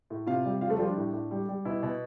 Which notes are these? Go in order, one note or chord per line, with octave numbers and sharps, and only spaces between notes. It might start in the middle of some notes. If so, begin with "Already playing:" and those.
A2
C3 F4 F5
G3
G3 F4 F5
A3 A4
F3 G3 F4
D4
A2
A2
G3
G3
B2 E4
B2